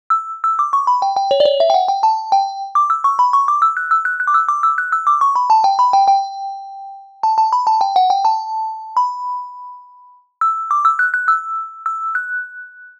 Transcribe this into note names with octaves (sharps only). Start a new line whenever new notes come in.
E6
E6
D6
C#6
B5
G5
G5
C#5
D5
C#5
E5
G5
F#5
G5
A5
G5
D6
E6
C#6
B5
C#6
D6
E6
F#6
E6
F#6
F#6
D6
E6
D6
E6
F#6
E6
D6
C#6
B5
A5
G5
B5
G5
G5
A5
A5
B5
A5
G5
F#5
G5
A5
B5
E6
D6
E6
F#6
F#6
E6
E6
F#6